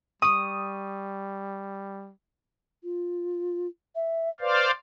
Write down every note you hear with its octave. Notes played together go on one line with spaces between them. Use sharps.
G3 C#6 D#6 D#7
F4
E5
B4 C5 D5 F5